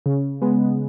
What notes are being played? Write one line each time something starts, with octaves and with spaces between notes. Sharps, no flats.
C#3
G#3 B3